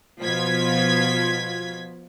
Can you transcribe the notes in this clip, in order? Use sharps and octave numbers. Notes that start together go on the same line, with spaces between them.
B2 F3 F4 G#6 B6